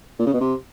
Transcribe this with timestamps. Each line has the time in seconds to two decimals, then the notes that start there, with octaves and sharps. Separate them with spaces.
0.19 A#2
0.26 C#3
0.33 B2
0.40 C3